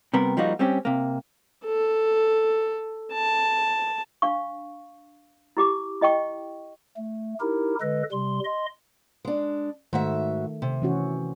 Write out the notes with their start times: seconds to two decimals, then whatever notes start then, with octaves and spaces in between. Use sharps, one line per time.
0.14 C3 G3 B3 A#4
0.37 F3 G3 A#3 D#4 F#4
0.59 G3 C4 C#4 G4
0.85 C3 A#3
1.65 A4
3.12 A5
4.22 D4 F5 C#6
5.57 E4 G4 D6
6.01 E4 D#5 G5 C#6
6.97 A3
7.40 D#4 E4 G4 A#4
7.81 D3 G#3 A4 B4 D#5
8.12 C3 G3 C6
8.44 D#5 C6
9.25 G#3 D4
9.93 G#2 D#3 A3 F#4 E5
10.62 C3
10.82 E3 C#4 F#4